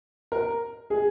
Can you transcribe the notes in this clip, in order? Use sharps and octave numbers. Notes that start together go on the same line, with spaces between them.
A#4
G#4